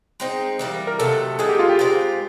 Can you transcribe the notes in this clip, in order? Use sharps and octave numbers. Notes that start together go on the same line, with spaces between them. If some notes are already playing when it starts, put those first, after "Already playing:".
G#3 C4 D#4
E3 G3 A#3
A#4
C3 D#3 F#3 A3 A4
G#3 B3 D#4 G#4
G4
F4
G4
G#3 C4 F4 A#4